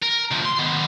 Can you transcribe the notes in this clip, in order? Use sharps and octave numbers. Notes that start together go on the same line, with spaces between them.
A#4
D2 F3
C6
D#3 B3